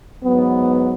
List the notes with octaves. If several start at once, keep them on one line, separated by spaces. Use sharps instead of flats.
G#2 F#3 B3